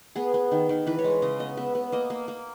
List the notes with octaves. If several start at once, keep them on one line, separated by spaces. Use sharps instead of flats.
B3 G#4
B3
D#3
D#3
E3 B4
C#5
G#3
C#5
C#3 D#5
B3 D#5
B3 E5
B3
A#3 D#5
A#3
A#3